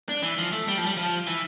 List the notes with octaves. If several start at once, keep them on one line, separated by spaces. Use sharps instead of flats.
D4
E3
F3
A3
G3
F3
G3
F3
E3